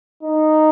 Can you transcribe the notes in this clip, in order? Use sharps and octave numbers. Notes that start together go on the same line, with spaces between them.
D#4